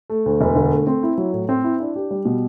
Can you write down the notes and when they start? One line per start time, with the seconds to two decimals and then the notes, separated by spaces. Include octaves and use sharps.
0.10 A3
0.26 D2
0.41 E1
0.56 D3
0.72 A3
0.87 C4
1.03 E4
1.18 F#3
1.33 A2
1.49 C4
1.64 E4
1.80 D4
1.96 G4
2.11 G3
2.25 B2